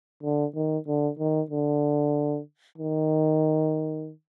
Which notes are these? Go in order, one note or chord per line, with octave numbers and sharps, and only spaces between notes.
D3
D#3
D3
D#3
D3
D#3